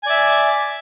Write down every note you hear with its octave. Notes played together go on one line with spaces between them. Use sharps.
D5 E5 G#5